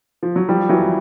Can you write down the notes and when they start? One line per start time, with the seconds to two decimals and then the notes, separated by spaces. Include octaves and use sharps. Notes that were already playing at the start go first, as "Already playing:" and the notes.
0.23 F3
0.36 F#3
0.49 F3 G3
0.69 E3 F#3